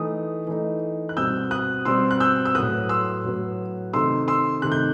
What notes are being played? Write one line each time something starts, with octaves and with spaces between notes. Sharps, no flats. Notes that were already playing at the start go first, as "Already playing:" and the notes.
Already playing: E3 A3 D#4 D#6
E3 A3 D#4
F#6
B2 G3 C4 E6 G6
D#6 F#6
B2 G3 C4 C6 E6
F#6
E6 G6
E6
A2 F#3 B3 D#6 F#6
C6 E6
A2 F#3 B3
C3 D#3 A3 C6 E6
C6 E6
C3 D#3 A3 F#6
G6